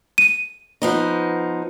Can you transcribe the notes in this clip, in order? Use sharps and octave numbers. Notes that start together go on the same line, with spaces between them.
D#7
F3 B3 D#4